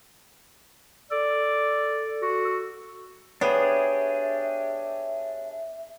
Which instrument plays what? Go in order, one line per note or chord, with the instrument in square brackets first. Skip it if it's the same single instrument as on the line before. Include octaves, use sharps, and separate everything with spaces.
[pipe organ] A4 [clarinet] D5
[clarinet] F#4
[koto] B3 [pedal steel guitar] D4 G4 G#4 [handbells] C#5 [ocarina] E5